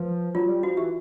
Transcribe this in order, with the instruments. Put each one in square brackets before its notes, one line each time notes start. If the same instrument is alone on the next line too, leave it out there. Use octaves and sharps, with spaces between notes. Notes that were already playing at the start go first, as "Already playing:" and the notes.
Already playing: [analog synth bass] F3 [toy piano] B4
[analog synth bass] F#3 [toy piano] F4
[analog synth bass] G3
[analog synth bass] F3 [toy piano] F#4
[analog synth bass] E3 [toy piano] G4